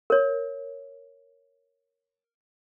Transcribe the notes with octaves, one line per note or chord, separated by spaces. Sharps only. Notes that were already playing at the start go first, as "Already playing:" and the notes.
A#4 C#5